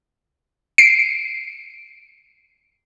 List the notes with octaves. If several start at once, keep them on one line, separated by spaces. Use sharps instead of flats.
C7 D7